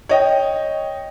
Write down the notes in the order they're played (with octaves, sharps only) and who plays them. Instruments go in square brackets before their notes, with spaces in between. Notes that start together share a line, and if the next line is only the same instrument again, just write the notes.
[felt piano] C#5 D#5 G5